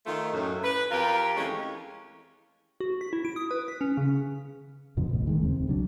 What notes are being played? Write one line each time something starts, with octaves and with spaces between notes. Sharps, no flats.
D#3 A3 D#4 F4
F#2 A2
B4
F2 F4 G4 A#4
E3 G#3 A3 C#4
F#4
B6
E4
D7
D#6
B4
B6
C#4
C#3
F2 B2 D3 F3
D1 A1
D#3 G#3
D#2 C#3 C4
E1
C#2 F#3 D4